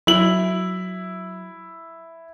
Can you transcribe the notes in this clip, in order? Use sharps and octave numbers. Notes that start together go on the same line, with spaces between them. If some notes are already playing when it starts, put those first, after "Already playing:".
F#3 E4 F#7